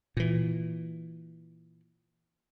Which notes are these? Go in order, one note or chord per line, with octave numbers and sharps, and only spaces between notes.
A#2 E3